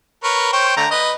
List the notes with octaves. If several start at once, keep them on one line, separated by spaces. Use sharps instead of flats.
A#4 B4 C#5
C5 C#5 G5
D3 A3 A#5
B4 D#5